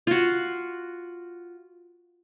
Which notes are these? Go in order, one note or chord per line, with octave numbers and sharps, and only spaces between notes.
F4 F#4